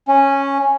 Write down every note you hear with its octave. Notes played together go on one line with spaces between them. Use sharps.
C#4